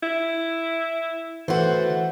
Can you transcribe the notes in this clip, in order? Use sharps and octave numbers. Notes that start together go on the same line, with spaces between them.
E4
E3 A3 F#4 C5